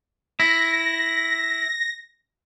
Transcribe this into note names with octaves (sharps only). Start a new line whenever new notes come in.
E4 A#6